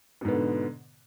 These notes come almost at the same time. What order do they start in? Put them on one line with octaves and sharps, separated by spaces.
B2 G#2 B3 D3